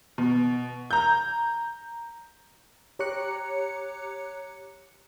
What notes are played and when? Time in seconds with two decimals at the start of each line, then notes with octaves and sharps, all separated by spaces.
0.18 B2
0.91 A#5 G6
2.99 G4 C#5 A#5 D6 F#6 C#7